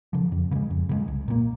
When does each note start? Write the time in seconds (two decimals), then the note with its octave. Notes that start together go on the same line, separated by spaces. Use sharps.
0.13 C#3 F3
0.32 F2
0.51 C#3 F3
0.55 G#3
0.71 F2
0.89 C#3 F3 G#3
1.08 C2
1.28 A#2 F3 A#3